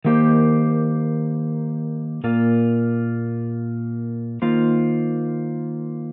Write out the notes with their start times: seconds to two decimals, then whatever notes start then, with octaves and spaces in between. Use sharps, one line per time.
0.05 D#3 A#3 G4 C5
2.24 A#2 A#3 F4
4.42 D#3 A#3 F4 C5